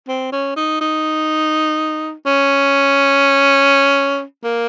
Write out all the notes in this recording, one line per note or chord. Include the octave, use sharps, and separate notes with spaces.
C4
C#4
D#4
D#4
C#4
A#3